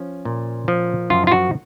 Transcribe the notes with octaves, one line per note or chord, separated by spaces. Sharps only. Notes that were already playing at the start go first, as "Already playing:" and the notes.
Already playing: F3 C#4
A#2
F3
F#2 F4
F4
F#4